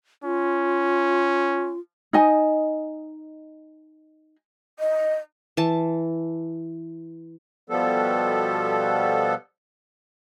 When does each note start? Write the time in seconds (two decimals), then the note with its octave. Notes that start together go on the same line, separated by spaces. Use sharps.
0.24 C#4 F4
2.13 D#4 D#5 G#5
4.79 D#5
5.57 E3 A5
7.70 B2 F3 G3 B3 A4